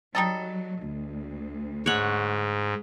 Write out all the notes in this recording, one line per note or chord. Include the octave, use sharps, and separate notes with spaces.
F#3 G3 D#4 A4
D2
G#2 C#5 F#5